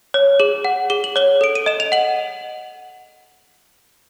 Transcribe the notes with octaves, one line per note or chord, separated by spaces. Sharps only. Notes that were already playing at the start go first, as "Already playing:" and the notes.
C#5
G#4 F#7
F#5
G#4 G7
F#7
C#5 G7
A4 D7
D#7
D#5 E7
F7
F#5 F#7